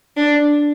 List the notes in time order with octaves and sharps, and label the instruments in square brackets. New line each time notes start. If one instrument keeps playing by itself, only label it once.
[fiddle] D4